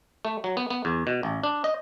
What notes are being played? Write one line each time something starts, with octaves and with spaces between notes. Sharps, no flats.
A3
F#3
B3
B3
E2
B2
A1
D4
D#5